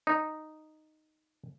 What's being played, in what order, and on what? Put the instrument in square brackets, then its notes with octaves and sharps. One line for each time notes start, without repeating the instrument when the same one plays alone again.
[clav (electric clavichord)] D#4